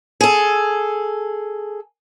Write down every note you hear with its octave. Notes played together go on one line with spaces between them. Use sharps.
G#4 A4